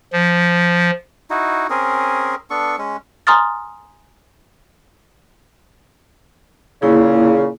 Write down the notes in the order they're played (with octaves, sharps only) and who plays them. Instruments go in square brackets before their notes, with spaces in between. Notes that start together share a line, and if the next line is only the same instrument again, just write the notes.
[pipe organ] F3
[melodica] D#4 E4 F#4
C4 C#4 G#4 A#4
B3 D4 A4 C#6
G#3 C#4
[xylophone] G#5 A#5 C6 D#6 F6 A6
[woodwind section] A#2 C#3 [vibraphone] A#3 E4 G#4